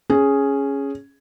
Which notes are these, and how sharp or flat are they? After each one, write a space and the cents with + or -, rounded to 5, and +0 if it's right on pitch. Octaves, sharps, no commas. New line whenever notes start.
C#4 +0 G#4 +0